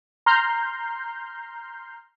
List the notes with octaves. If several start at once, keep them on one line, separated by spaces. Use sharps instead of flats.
A#5 C6 F6 G6 C7